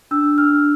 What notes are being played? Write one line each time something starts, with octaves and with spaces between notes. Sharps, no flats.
D4 E6
D4 F6